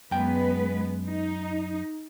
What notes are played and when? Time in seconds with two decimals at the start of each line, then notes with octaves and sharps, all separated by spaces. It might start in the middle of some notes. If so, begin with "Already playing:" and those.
0.11 F#2 G#3 B3 B4 G5
1.07 D#4